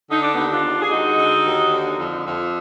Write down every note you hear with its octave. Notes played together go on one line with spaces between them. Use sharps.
D3 D#4
D4
D#2 B3 D#4
D4 F4
D#2
G#4
G#3 D#4 F#4
D3
D#2
D3
F2
F2